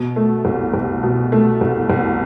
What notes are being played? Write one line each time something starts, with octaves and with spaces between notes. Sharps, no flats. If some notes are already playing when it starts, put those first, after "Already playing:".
Already playing: B2
A3
C2
C2
B2
A3
C2
C2